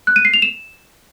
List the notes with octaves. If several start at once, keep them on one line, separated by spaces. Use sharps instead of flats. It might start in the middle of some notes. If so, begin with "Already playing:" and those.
F#6
D#7
C7
F7
E7